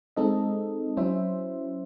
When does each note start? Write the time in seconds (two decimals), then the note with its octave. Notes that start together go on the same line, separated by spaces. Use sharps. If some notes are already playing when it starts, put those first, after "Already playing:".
0.17 G#3 C4 D#4 A4 D#5
0.97 F#3 C#4 E4 C5 E5